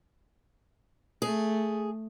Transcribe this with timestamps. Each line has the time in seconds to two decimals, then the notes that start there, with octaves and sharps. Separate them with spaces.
1.22 A3 G#4